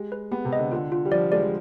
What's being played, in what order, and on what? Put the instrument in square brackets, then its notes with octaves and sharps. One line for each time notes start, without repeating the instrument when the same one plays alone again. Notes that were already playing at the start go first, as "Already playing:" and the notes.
Already playing: [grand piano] G#3 [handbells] G4
[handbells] B4
[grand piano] B3 [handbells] G4
[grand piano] C3
[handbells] D#5
[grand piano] D3
[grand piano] D3 [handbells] F4
[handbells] F4
[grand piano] G3
[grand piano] F3 [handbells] D5
[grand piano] G#3 [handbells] D5
[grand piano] F3